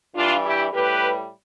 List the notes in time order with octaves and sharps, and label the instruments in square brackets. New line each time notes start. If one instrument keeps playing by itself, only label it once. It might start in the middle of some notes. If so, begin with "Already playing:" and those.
[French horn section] G2 E3 G3 D4 F4
E4 G4
A2 G3 G4 B4